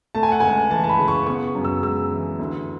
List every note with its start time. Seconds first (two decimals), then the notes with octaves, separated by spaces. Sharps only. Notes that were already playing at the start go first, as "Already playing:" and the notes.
0.15 A3 A5
0.23 G#5
0.32 F#5
0.40 C#2 G#5
0.71 E3 A5
0.84 A5
0.89 B5
0.99 C#3
1.08 C#6
1.27 B3 C#6
1.55 F#2
1.65 E6
1.83 G#3 E6
2.11 E3
2.39 D2